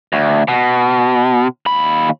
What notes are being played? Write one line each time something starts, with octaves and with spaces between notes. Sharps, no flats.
D2
B2
D#2 B5